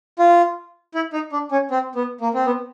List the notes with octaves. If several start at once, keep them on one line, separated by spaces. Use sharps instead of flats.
F4
E4
D#4
D4
C#4
C4
B3
A#3
C4
B3